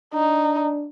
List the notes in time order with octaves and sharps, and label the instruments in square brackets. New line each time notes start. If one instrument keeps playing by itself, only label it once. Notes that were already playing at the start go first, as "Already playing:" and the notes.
[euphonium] D4 [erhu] D#4